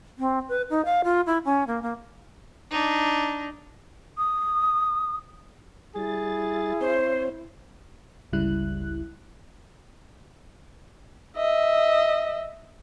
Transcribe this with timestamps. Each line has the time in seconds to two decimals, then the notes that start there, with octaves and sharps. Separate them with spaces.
0.18 C4
0.49 B4
0.70 D#4
0.85 F5
1.04 F4
1.26 E4
1.45 C#4
1.67 A#3
1.82 A#3
2.71 D4 D#4
4.18 D#6
5.96 G3 E4 G#4 A6
6.81 C4 C5 C#5 C6
8.33 G1 C#2 C#3 G3 E4 F#6
11.37 D#5 E5